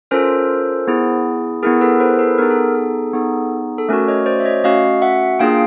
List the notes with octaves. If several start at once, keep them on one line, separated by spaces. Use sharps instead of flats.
C#4 F4 A4 A#4 C5
B3 E4 G#4
B3 E4 G#4 A#4
A4 B4
A#4 C5
A4 B4
B3 D#4 G#4 A#4
A4
A4
B3 D#4 G#4
A4
A3 C#4 F#4 A#4
C#5 D#5
C5 D5
E5
C#5 D#5
A3 C#4 F#4 D#5 F5
E5 F#5
A#3 D4 F4 G#4 F5 G5